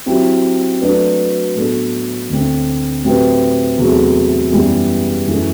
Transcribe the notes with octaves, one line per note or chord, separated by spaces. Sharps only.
F#3 C4 E4 G4
F#3 A3 D4 F#4 B4
A2 F#3 B3 D4 A4
D2 D3 A3 C4
A2 F#3 C4 G4 B4
E2 C3 F#3 A3
F#2 E3 G3 B3
F#2 E3 A3 E4 A4